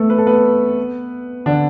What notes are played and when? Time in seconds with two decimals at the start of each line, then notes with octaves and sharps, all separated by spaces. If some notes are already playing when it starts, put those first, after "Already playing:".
Already playing: A3 B3 A4
0.10 B4
0.18 A4
0.26 B3 B4
1.46 D3 D4